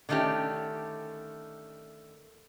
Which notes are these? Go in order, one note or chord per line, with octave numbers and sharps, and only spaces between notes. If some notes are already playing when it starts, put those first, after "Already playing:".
D3 D#3 A3 C#4 G4